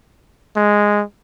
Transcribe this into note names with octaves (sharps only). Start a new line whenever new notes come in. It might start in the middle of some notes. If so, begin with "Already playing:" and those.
G#3